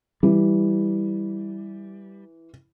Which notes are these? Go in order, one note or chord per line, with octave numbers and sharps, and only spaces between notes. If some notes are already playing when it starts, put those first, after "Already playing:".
E3 G3